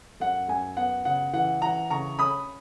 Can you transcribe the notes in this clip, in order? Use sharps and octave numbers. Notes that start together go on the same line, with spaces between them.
F#2 F#5
F#2 G#5
B3 F#5
C#3 F#5
E3 F#5
E3 F#5 A#5
C#3 A#5 C#6
C#4 B5 D#6